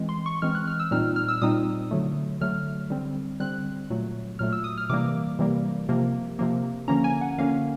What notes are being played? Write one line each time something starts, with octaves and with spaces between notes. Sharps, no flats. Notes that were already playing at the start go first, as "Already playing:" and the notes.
Already playing: E3 G#3 C4
C6
C#6
E3 G#3 C4 F6
F#6
F6
E6
A#2 G3 C4 D#4 F6
F6
E6
A#2 G3 C4 D#4 D#6
D3 F#3 A3
D3 F#3 A3 F6
D3 G3 C4
D3 G3 C4 F#6
A#2 F#3 A3
A#2 F#3 A3 F6
E6
D#6
F6
C3 E3 G3 A#3 D6
C3 E3 G3 A#3
C3 F3 A#3
C3 F3 A#3
D3 F3 A#3 C#4 A#5
G#5
F#5
D3 F3 A#3 C#4 F5